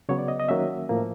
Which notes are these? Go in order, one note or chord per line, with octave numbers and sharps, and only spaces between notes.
C#3 F#3 B3 C#5
D5
D#5
D#5
D#3 F#3 A#3 C#4 E5
A2 F3 A#3